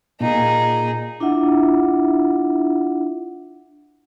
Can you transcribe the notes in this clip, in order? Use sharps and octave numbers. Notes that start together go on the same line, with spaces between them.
A#2 D#4 G#4
D4 E4 F4 E5 F#5